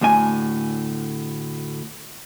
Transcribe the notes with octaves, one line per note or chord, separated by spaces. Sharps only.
D2 A2 G#5